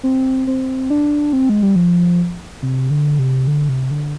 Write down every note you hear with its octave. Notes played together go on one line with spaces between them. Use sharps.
C4
C4
D4
C4
G#3
G3
F3
C3
D3
C3
D3
C3
D3